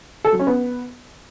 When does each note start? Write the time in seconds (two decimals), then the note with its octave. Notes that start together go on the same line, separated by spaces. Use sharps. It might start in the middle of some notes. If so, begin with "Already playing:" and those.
0.25 A4
0.32 F#3
0.39 C#4
0.47 B3